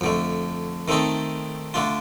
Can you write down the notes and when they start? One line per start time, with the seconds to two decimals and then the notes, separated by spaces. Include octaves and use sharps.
0.01 F2 D3 A3
0.88 D#3 A3 C4 D#4 A4
1.74 D3 A3 D4 F4